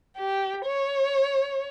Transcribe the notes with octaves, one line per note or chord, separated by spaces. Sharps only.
G4
C#5